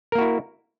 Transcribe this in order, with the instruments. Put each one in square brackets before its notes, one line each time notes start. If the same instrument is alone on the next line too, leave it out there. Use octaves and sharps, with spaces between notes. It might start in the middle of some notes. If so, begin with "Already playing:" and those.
[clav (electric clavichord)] A#4
A#3
F#4
E4